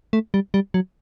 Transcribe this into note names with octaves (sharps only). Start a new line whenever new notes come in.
A3
G3
G3
F#3